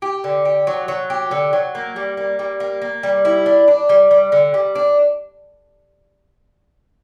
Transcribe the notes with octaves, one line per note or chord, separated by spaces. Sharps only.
G4
D3
G4
F#3
F#3
G4
D3
F#3
A#3
G3
A#3
G3
A#3
A#3
G3
E4
D4
D4
G3
G3
D3
G3
D4